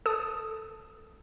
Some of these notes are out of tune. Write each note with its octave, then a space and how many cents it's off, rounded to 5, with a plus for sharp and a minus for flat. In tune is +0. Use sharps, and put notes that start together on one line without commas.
A4 +0 D#6 +0